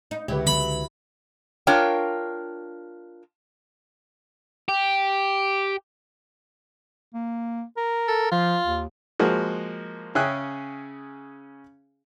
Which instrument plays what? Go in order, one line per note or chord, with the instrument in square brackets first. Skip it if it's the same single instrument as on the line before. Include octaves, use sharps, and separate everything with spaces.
[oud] D#4
[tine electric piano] C#2 D3 B4 [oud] F#3 E4 G4
[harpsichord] B5
[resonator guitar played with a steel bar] D4 F4 A#4 C#5 G5
[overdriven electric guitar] G4
[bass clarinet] A#3
A#4
[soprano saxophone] A4
[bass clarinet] F3 [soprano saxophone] F4
[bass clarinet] D#2
[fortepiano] F3 G#3 A#3 F#4
C#3 C#4 G#4 E5 G5 F#6